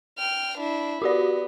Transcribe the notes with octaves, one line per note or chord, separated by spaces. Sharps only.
G5 F6
D4 E4
B3 F#4 G4 D5